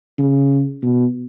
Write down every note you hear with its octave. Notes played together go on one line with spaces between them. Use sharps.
C#3
B2